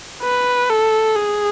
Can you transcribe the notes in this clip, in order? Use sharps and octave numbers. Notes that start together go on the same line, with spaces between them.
B4
A4
G#4